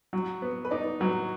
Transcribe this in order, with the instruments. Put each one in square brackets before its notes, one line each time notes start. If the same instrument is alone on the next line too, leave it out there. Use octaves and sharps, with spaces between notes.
[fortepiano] F#3
B3
[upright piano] B4
[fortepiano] D#4 [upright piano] D5
[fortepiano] F#3 [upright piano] B4